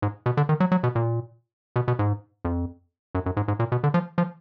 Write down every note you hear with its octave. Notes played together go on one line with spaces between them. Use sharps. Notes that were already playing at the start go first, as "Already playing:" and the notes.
G#2
B2
D3
D#3
F#3
F#3
B2
A#2
B2
B2
G#2
F2
F#2
F#2
G#2
G#2
A#2
B2
D3
F3
F3